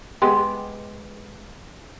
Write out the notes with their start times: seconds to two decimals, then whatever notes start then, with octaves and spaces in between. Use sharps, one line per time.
0.22 G#3 B3 G4